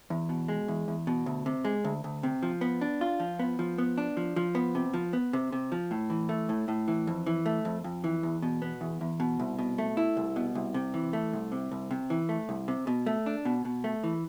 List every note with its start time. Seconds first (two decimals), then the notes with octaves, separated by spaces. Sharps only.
0.10 E2
0.29 B2
0.48 G#3
0.68 E2
0.88 E2
1.07 B2
1.26 D2
1.46 C3
1.65 G#3
1.85 D2
2.04 D2
2.23 C3
2.43 F3
2.61 B3
2.81 D4
3.01 F4
3.20 F3
3.39 B3
3.59 F3
3.78 B3
3.98 D4
4.17 F3
4.36 F3
4.55 B3
4.75 C3
4.94 F3
5.13 B3
5.33 C3
5.52 C3
5.72 F3
5.91 A2
6.10 E3
6.29 A3
6.49 A2
6.68 A2
6.88 E3
7.07 F2
7.26 E3
7.46 A3
7.65 F2
7.84 F2
8.04 E3
8.23 E2
8.42 B2
8.62 B3
8.81 E2
9.01 E2
9.20 B2
9.39 C2
9.59 B2
9.78 A3
9.97 E4
10.17 C2
10.36 B2
10.55 C2
10.74 C3
10.94 E3
11.13 A3
11.33 C2
11.52 C3
11.71 C2
11.91 C3
12.10 E3
12.29 A3
12.49 C2
12.68 C3
12.87 B2
13.06 A3
13.26 D4
13.45 B2
13.65 B2
13.84 A3
14.04 E3